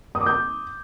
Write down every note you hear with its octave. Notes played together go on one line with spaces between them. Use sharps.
D#6
D6
G6